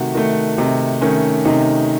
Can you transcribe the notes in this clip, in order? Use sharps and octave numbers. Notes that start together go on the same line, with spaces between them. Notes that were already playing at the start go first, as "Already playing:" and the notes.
Already playing: C3 D#3 A3 F#4
D#3 A3
C3 D#4
D#3 A3 C#4
C3 D#4